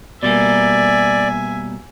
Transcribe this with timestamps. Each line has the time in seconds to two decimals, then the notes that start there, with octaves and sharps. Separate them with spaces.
0.23 B2 G3 A#3 D5 E5 G#5